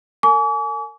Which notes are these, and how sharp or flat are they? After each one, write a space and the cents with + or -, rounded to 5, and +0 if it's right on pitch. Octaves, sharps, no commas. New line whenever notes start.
A#4 -45 G#5 +25 D6 -45